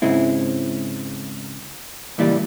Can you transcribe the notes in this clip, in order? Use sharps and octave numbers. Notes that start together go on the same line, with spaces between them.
G#2 C#3 G#3 C4 E4
C#2 A#2 E3 G3 D5